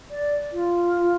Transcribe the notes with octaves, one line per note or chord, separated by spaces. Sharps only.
D5
F4